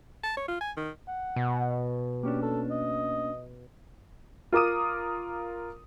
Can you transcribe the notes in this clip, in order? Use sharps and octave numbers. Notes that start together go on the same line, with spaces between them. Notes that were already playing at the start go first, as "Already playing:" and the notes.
A5
C#5
F4
G#5
D#3
F#5
B2
A#3 C#4 D4 G4
A4
D#5
F4 A#4 D6 D#6 D#7